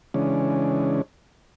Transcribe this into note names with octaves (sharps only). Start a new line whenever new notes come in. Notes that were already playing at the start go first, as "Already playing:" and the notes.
C#3 E3 G#3 C#4 D4